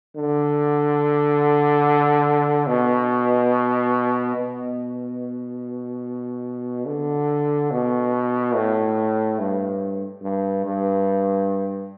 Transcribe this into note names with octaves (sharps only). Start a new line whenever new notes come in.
D3
B2
B2
D3
B2
A2
G2
G2
G2